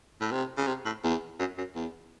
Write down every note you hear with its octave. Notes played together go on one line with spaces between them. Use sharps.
A2
C3
C#3
C3
A2
E2
F#2
F#2
E2